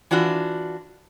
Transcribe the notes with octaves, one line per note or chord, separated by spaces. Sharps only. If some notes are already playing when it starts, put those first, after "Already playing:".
E3 D4 F4 F#4